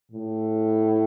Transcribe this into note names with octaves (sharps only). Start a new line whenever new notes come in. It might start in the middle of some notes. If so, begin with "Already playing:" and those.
A2